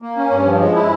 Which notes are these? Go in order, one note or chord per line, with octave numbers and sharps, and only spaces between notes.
A#3
C#4
G2
F3
G#3
E4